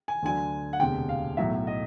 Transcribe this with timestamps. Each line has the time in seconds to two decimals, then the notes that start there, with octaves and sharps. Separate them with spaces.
0.08 G#5
0.22 D2 D3 F#3 G#5
0.73 F#5
0.79 E1 D2 C3 G5
1.09 F5
1.37 B1 A2 F#3 E5
1.67 D#5